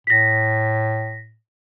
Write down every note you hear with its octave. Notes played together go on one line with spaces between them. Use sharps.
A2 A#6 B6